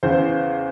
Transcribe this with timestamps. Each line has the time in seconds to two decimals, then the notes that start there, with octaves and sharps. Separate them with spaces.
0.03 E2 C#3 E3 C5